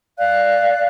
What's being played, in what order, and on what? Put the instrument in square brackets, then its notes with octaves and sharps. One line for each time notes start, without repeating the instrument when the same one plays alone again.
[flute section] D5 F5 F#6